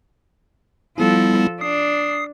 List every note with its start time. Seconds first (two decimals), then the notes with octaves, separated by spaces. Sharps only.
0.98 F3 G3 B3 E4 A4
1.61 D4 D#6 C7